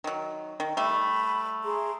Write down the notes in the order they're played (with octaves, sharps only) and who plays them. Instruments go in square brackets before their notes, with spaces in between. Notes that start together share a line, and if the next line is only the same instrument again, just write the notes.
[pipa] D#3 F#3
D#3
[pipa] G3 A3 [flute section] B5
[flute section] G#4 A#5 C6